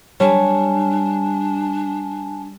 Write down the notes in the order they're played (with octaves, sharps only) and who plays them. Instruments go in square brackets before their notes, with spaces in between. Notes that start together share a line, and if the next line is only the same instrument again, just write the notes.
[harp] G3 [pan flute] D4 [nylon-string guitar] C#5 [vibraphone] G#5 A5